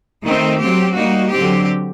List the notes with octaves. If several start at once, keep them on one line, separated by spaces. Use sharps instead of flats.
D#3 A3 C4 D#4
F#3 C4 G4
G3 A#3 D#4 F#4
D3 F#3 C4 G4